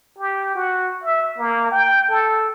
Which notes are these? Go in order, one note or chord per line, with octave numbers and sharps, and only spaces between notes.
G4
F#4
E5
A#3
G5
A4